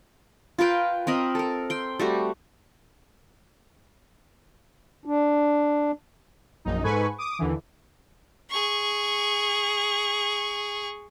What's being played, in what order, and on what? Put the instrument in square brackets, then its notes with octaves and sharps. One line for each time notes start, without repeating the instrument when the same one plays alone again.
[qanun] F4 A#4 B4 G5
C4 A#4 D#5 B5
A4 A#4
G5 C6
G3 A3 F#4
[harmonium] D4
[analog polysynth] A#1 F#2 D#4
G#2 A4 B4 G#5 B5 C#6
D6 D#6
D#2 D3 E3
[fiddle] G#4 C#6